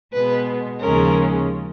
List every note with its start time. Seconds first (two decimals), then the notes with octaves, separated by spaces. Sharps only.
0.13 B2 G#3 B3 B4
0.81 D#2 C#3 F3 G#3 C#4 A#4